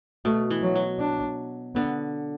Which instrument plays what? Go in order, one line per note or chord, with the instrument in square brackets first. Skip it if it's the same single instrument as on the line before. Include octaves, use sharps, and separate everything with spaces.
[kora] B2 [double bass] A3
[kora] E3
[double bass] F#3
[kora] F#3
[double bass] D4
[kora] D3 [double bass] B3